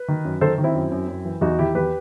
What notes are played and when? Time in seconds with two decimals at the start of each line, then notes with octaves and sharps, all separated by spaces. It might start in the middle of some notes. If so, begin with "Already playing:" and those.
Already playing: B4
0.08 D#3
0.25 F#2
0.41 D#3 A4 C5
0.58 D#3
0.64 C4 E4
0.75 F#2
0.92 F#2
1.08 F#2
1.25 E3
1.41 E2 D#4 F#4
1.59 D#3 E4 G4
1.75 E2 G4 B4